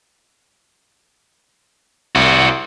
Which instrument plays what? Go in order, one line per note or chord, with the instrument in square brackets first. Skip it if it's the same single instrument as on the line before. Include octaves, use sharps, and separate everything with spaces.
[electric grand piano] C2 [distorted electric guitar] F#4 D5